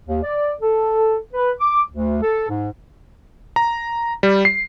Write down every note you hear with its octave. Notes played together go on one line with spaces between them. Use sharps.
D#2
D5
A4
B4
D6
D2
A4
G#2
A#5
G3
C7